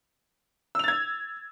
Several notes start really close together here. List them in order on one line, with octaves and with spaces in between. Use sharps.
E6 F7 A6 G#6